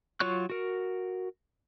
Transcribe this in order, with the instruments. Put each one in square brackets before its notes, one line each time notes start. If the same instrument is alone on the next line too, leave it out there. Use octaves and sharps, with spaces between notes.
[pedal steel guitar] F#3 F4 C#5 C#6 F#6
F#4 A#4